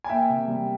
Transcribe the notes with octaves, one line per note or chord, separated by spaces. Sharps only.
G#5
A#3 E5 G5
C3
G3